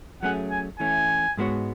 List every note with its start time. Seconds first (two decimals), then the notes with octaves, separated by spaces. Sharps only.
0.23 F#3 A3 C#4 G#4 F#5
0.50 G#5
0.79 E3 A3 C#4 G#5
1.37 G#2 G#3 B3 F#4 C#5